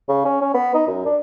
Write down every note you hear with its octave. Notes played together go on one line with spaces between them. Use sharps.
C#3
C#4
C#4
B3
D#4
F#2
D4